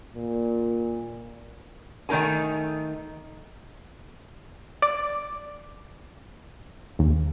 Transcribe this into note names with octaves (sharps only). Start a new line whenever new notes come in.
A#2
D#3 A3 D#4 A#4 G#5
D5
D#2